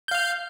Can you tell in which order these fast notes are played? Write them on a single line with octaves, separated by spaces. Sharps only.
G6 F5 F6